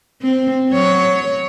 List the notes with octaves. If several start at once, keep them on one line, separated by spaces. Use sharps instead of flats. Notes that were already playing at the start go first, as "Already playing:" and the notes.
C4
F#3 C#5